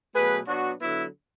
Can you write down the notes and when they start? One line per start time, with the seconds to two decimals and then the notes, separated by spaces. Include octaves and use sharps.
0.15 B2 F#3 A3 G#4 B4
0.47 B2 F#3 B3 D4 F#4
0.80 D3 F#3 B3 E4